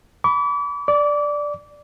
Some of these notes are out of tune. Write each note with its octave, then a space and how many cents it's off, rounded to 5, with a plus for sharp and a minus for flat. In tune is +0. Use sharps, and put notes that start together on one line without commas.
B5 +0 D6 -40
D5 +0 D6 -25